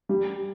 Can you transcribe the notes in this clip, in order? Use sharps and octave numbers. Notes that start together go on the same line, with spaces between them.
G3